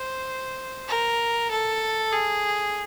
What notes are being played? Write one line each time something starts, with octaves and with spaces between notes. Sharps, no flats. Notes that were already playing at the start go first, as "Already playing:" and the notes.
Already playing: C5
A#4
A4
G#4